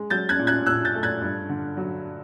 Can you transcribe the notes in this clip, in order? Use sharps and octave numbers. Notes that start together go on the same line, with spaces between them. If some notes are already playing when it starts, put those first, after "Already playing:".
Already playing: G#3
F#3 G6 A6
F#6 G#6
A#2
F#6 G#6
A#2 E6 F#6
G6 A6
A3
F#6 G#6
G2
D3
F#3